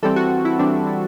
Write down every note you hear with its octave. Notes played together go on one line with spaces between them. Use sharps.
E3 G3 C4 A4
F#4
E4
E3 G3 C4 D4
E4